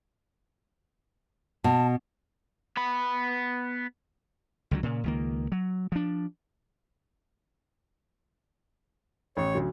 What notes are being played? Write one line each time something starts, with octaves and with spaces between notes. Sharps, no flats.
B2 A5
B3 B5
C#2 D3 F#3
A#2 C#3
C#2 D#3 A#3
F#3
F3 D4
A1 C#5
D2 F#3